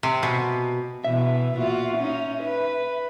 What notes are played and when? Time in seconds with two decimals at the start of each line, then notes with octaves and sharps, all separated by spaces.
0.03 C3
0.23 B2
1.04 B2 E3 B3 E5
1.56 A#2 F4 F#4
1.97 C#4 D#4
2.43 B4